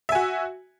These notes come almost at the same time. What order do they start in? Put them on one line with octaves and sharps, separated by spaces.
E5 G#5 F#4